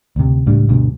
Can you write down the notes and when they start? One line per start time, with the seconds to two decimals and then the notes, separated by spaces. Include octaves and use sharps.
0.16 D2 C3
0.46 C#2 A2 G3 D4
0.69 D2 G2 B2